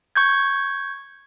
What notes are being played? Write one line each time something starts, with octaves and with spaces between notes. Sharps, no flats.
C#6 G6 G#6